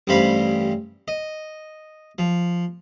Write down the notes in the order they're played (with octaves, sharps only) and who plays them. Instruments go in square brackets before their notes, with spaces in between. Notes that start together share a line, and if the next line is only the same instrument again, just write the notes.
[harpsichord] A1 G2 G3 C5 F5 B5
D#5
F3